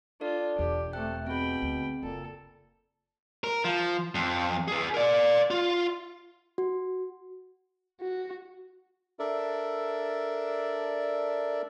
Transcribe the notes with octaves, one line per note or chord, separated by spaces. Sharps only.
D4 F4 A4 D5
E1 E2 G4
C3 A3 A4 G5 F#6
B2 C4 G#4 G5 B5
D2
F#1 A#2 A4
A#4
F3
F2
G#4 B4
A#4 D5
F4
F#4
F#4
D4 A4 A#4 D5 E5